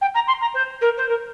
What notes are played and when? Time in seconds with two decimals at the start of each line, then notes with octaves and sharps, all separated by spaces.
0.01 G5
0.14 A#5
0.27 C6
0.41 A#5
0.54 C5
0.81 A#4
0.97 C5
1.09 A#4